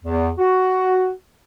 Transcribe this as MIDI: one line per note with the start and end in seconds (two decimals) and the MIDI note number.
0.05 0.30 40
0.38 1.11 66